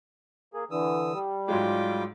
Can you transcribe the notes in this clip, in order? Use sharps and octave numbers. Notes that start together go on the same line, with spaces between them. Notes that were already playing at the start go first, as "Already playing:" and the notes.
A#3 G#4
D3 E3 D#6 E6
G3
G#2 F#3 G#3 F4 G5 D6